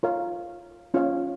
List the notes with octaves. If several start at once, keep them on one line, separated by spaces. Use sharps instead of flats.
F4 A#4 C#5 F5
C#4 F4 C#5 F5